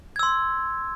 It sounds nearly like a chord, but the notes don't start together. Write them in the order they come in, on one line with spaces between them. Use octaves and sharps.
G#6 E6 C6